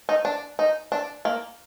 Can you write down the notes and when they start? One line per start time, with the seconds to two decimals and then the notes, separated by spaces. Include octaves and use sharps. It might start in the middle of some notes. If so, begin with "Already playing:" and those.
0.09 D#4
0.25 D4
0.59 D#4
0.92 D4
1.25 A#3